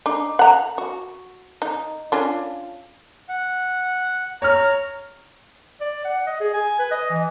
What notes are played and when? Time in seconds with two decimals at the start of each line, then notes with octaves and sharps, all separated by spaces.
0.06 D4 D#4
0.39 F#5 A#5
0.78 F#4
1.62 D#4
2.12 C#4 D4 F4
3.29 F#5
4.42 C#5 A#5 F6
5.81 D5
6.05 F#5
6.27 D#5
6.40 G#4
6.54 G#5
6.79 B4
6.91 D#5
7.10 E3